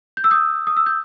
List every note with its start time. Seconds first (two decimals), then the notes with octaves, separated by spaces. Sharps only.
0.17 G6
0.24 E6
0.31 D#6 G6
0.67 D#6
0.77 E6
0.86 G6